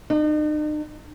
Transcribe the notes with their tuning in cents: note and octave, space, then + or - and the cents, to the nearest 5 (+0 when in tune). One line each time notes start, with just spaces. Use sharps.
D#4 -45